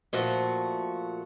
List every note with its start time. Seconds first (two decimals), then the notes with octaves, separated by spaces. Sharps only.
0.13 A#2 F3 A3 F#4